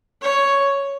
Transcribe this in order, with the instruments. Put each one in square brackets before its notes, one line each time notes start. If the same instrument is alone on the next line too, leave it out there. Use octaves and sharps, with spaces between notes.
[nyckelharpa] C#5